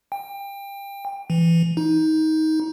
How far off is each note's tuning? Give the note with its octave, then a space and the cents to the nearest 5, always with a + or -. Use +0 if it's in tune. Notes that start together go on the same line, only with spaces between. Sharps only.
G5 +25
E3 +20
D#4 +20